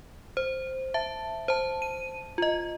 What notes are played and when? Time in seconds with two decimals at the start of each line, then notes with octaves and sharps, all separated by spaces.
0.37 C5
0.94 E5 A5
1.48 C5 A5
1.82 D#7
2.38 F4 D#5